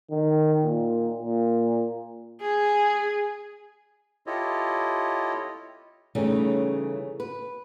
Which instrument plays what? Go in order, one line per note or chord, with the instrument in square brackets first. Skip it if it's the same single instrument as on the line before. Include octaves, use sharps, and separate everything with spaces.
[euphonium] D#3
A#2
A#2
[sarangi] G#4
[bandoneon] E4 F4 G4 A4 C#5 D#5
[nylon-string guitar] C#3 E3 G3 A3 C#4 D#4
B4